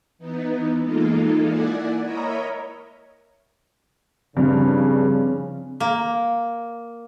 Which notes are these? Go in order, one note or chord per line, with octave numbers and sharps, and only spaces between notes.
E3 B3 D#4
E3 G#3 A#3 D#4 F4 A4
A#3 E4 D5 F#5 G#5
A#4 C#5 D#5 E5 A#5 B5
G2 C#3 F3 C4 D4
A#3